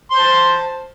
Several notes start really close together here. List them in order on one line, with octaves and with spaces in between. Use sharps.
C6 C5 A5